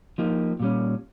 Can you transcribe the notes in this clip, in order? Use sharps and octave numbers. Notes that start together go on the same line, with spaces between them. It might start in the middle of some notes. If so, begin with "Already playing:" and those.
F3 A#3 D#4 G4
A#2 G3 C#4